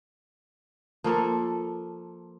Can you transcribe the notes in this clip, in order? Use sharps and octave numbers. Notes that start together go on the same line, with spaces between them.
F3 A#3 A4